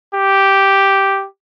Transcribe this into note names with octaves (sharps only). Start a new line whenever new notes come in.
G4